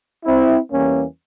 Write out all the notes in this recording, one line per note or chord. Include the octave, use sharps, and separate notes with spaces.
C4 E4
E2 E3 G3 A#3 C#4